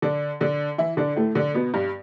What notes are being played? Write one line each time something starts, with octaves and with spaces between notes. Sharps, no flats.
D3 D4
D3 D4
E3 E4
D3 D4
A2 A3
D3 D4
B2 B3
G2 G3